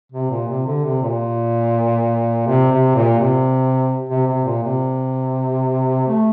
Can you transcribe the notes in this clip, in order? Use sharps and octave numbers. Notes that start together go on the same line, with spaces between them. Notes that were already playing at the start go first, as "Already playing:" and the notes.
C3
A#2
C3
D3
C3
A#2
C3
C3
A#2
C3
C3
C3
A#2
C3
A3